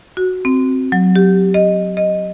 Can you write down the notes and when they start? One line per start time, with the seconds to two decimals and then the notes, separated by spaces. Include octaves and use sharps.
0.17 F#4
0.45 C4
0.92 F#3
1.15 G4
1.54 D#5
1.97 D#5